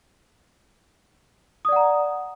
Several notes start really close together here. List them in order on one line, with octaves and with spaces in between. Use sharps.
D#6 D5 F#5 A#5